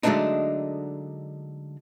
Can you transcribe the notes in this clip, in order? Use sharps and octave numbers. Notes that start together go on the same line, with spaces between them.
D3 F#3 G#3 A3 D4 D#4